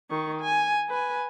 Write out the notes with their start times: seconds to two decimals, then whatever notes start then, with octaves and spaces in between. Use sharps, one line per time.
0.10 D#3 C#6
0.41 G#5
0.89 B4 G#5